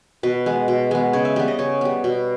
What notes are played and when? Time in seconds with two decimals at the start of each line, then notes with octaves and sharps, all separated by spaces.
0.23 B2 B4
0.46 G#3 B3
0.68 B2
0.91 G#3 B3
1.13 C#3 C#5
1.25 E5
1.36 G3 B3 E5
1.48 D#5
1.59 C#3 C#5
1.81 G3 B3
2.04 B2